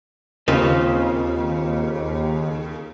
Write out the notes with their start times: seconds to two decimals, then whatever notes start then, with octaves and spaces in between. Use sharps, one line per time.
0.48 D#2 C#3 A#3 C4 F4